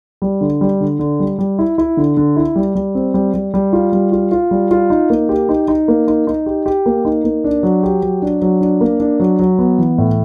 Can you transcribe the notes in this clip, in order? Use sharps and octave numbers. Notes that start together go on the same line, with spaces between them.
G3
D3
G3
D3
D3
G3
G3
E4
E4
D3
D3
E4
G3
G3
C4
G3
G3
G3
F4
G3
F4
F4
G3
F4
D#4
A#3
G4
D#4
D#4
A#3
D#4
D#4
G4
G4
A#3
D#4
A#3
D4
F#3
G4
F#3
D4
F#3
D4
A#3
D4
F#3
F#3
B3
E3
A2